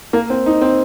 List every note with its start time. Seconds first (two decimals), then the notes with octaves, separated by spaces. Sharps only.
0.13 A#3
0.30 C4
0.46 D#4
0.62 C4